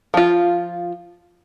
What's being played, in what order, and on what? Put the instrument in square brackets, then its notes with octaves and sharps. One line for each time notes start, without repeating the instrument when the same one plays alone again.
[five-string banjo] F3 F4